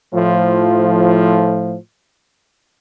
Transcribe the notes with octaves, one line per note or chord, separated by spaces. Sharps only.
A2 F3